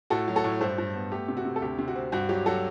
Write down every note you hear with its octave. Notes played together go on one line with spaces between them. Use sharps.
A2 F#4 A4
F#3
F#4 A4
A2
G2 A4 C5
G2
B3
A3 G4
C3
F#4
C3
A4
D2 G4
C3
F#4
C4
G2 F#4
F#3 G4
F#3 F#4 A4